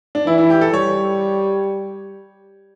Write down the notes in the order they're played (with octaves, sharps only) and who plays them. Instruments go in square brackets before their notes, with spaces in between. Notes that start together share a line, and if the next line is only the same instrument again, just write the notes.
[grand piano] D4
[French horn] E3 [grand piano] E4
[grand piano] E4
G4
A4
[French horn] G3 [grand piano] C#5